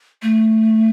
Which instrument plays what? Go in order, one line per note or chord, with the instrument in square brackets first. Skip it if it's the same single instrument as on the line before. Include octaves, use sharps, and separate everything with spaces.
[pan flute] A3